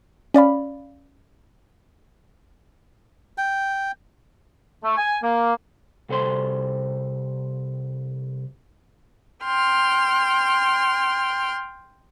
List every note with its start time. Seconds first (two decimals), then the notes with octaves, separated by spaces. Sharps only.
0.34 C#4 D5 F5 B5
3.38 G5
4.83 A3
4.97 G#5
5.23 A#3
6.09 C2 A4 C5 C6
9.43 G5 C6 F6